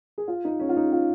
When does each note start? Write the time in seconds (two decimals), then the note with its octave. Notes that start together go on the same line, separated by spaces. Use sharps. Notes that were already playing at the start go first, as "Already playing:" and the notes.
0.18 G#4
0.28 F4
0.45 D#4
0.60 C#4
0.69 F4
0.76 D#4
0.92 F4